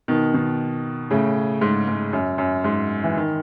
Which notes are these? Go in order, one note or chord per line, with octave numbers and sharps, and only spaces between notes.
B2 D#3
B2 D#3
A2 C#3
G#2
G#2
F#2
F#2
G#2
E3
D#3